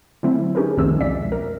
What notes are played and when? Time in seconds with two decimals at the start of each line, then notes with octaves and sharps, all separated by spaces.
0.23 D3 F#3 A3 C4 E4
0.55 C#4 D#4 G4 G#4 A#4 B4
0.77 C2 F2 D#3 A3 C#4 E6
1.00 B1 F2 G#3 D5 E5 B6
1.32 A#4